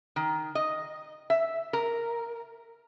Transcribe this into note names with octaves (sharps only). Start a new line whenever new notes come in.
D#3
D#5
E5
A#4